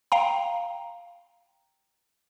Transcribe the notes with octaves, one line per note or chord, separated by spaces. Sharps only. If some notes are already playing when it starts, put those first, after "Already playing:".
F5 G5 A#5